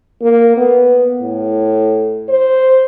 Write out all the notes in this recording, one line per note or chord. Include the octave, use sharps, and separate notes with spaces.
A#3
B3
A2
C5